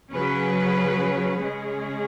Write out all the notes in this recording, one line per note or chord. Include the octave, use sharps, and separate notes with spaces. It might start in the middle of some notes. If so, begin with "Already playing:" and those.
C#3 F#3 C#4 G#4 B4
C#3 G#3 C#4 G#4